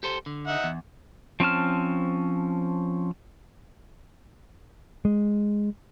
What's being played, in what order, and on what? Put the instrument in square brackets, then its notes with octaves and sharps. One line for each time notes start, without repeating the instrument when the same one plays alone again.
[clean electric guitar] G4 A4 C5
D3
[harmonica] D#4 E5 F#5
[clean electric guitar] E2
[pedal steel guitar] F3 C4 C#4 A5 F6
[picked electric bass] G#3